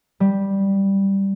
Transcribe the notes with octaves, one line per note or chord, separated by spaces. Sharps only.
G3